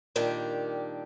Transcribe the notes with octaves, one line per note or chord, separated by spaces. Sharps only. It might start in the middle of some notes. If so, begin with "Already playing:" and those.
A#2 D#3 G3 D4 G4